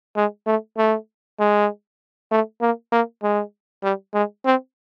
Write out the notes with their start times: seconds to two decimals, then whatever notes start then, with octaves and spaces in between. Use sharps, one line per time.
0.16 G#3
0.46 A3
0.77 A3
1.39 G#3
2.31 A3
2.61 A#3
2.92 A#3
3.23 G#3
3.83 G3
4.14 G#3
4.45 C4